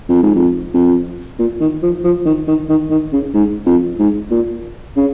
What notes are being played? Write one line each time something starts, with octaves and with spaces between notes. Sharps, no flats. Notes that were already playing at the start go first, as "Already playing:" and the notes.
F2
G#2
F2
F2
A#2
D#3
F3
F3
D#3
D#3
D#3
D#3
C#3
G#2
F2
G#2
A#2
C#3